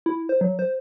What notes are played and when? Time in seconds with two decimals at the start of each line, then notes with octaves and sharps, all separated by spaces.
0.06 E4
0.29 C5
0.41 F#3
0.59 C5